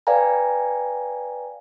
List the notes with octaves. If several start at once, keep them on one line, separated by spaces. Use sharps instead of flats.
B4 D5 F5 G5 G#5 A#5